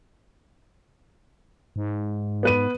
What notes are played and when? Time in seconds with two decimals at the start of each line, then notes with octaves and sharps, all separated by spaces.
1.76 G#2
2.43 B3 B4 D#7